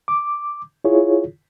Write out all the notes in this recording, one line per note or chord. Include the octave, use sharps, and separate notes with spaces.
D6
E4 F4 G#4 C#5